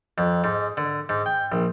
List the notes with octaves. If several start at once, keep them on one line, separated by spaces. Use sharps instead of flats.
F2
G#2
D3
G#2
G5
A#1